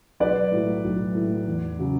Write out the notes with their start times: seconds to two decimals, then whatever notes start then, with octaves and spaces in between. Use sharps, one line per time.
0.20 B1 B4 D5
0.52 A2 F#3
0.84 B1
1.15 A2 F#3
1.46 E2
1.79 C#3 F#3